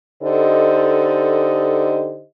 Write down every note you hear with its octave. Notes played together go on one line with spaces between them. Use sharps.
D3 D#4 G4 A4 C5 D#5